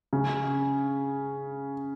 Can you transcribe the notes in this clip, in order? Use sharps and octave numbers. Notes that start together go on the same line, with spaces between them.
C#3